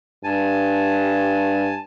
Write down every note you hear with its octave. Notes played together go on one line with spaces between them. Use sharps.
G2 G#5 A5